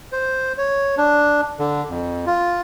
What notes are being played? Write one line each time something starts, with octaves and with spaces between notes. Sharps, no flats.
C5
C#5
D4
D3
F2
F4